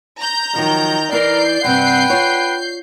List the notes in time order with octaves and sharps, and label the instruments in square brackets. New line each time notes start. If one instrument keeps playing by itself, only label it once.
[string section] A#5 G6
[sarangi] D#3 [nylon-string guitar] F3 F#3
[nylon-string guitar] E3 E4 [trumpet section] A#4 [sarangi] D5 [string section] G6 C7
[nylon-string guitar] G2 C3 C4 [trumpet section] B4 G5 [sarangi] F#5
[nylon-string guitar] F4 C#5